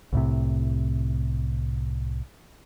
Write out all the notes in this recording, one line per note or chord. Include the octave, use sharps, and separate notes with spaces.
C2 A2 C3